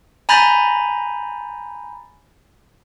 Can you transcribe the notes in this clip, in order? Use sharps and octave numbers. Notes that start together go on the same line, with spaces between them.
G#5 A#5 B5 G6 A6 A#6